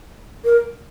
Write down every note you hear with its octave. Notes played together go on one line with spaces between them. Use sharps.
A#4